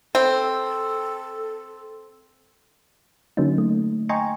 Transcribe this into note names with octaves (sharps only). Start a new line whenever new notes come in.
C4 A4
D3 F#3 A#3 C#4 D#4
A3
D#5 G5 G#5 A#5 C6 C#6